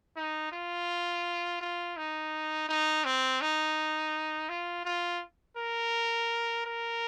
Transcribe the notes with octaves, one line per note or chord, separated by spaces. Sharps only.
D#4
F4
F4
D#4
D#4
C4
D#4
F4
F4
A#4
A#4